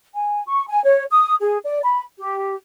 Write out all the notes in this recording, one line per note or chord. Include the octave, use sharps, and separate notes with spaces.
G#5
C#6
G#5
C#5
D#6
G#4
D5
B5
G4